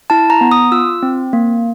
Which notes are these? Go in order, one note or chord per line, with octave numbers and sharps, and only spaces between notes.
E4 A5
A#5
B3
D#6
F4 E6
C4
A#3